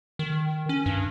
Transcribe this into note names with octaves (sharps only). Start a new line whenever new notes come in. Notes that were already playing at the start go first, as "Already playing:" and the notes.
D#3
C#4
G2